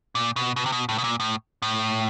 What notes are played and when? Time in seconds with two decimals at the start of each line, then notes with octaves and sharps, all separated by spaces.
0.15 A#2
0.36 B2
0.56 B2
0.66 C3
0.72 B2
0.89 A2
0.98 B2
1.04 A#2
1.20 A2
1.62 A2